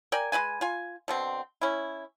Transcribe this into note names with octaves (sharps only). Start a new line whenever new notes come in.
A#4 D5 G5 G#5
G#3 E4 B4 G#5
F4 G#5
B2 D3 C4
C#4 E4